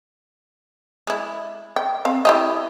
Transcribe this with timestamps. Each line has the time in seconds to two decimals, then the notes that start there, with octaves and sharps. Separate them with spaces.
1.07 G#3 E4
1.76 G5
2.05 C4 F5
2.25 E4 G4 D#5